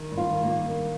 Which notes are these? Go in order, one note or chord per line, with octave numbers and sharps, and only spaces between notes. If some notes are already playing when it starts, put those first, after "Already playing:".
Already playing: D#3
G2
F4
D#3
A#3
G2
D#3